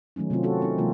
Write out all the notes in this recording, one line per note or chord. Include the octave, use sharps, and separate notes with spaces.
D#3 F#3 A3 C#4 D#4
C3 F#3 A3 C4 F4
C4 C#4 F#4 A4
C4 D#4
C3 E3 F#3 G#3 A#3 F4